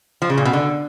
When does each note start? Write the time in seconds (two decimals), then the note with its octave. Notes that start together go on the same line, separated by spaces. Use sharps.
0.22 F3
0.30 C#3
0.38 A#2
0.45 B2
0.53 D3